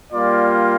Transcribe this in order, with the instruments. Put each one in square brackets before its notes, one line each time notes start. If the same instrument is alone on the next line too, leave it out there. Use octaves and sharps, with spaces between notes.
[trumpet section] G3 A#3 F4 D5